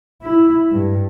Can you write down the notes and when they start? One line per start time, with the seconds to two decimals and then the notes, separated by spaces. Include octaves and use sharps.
0.22 E4
0.71 G2